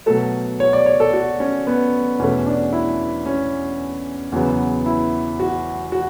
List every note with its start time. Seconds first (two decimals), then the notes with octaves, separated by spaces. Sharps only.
0.06 B2 F#3 A3 A4
0.60 C#5
0.73 D5
0.86 C#5
1.00 A4
1.13 F#4
1.40 C#4
1.67 B3
2.19 E2 B2 A3 C#4
2.46 D4
2.73 E4
3.26 C#4
4.32 E2 C#3 F#3 B3
4.86 E4
5.40 F#4
5.92 F#4